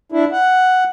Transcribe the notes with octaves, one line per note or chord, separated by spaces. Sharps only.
D4 E4
F#5